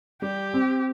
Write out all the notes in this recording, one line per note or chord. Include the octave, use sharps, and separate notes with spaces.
G3 G4
C4